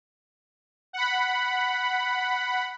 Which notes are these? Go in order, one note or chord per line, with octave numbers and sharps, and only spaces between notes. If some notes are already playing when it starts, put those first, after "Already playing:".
F#5 B5